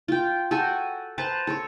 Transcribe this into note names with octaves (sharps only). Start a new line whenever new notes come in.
F4 G5
F#4 A4 G5 G#5
B4 C5 A5 A#5
A4 C#5